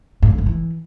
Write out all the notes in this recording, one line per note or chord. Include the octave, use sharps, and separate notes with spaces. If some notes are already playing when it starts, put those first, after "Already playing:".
G2
D3
G#2
E3